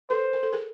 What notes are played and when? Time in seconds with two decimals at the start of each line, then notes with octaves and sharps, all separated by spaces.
0.10 A4 B4 C5
0.33 A#4
0.43 A4
0.53 G#4 A#4